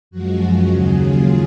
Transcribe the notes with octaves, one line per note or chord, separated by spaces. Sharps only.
F#2 F3 G#3 F#4
F#4
D#2 C#3 F#3 G#4
F4